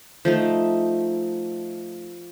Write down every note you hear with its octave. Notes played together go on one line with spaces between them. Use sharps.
F3 A3 D#4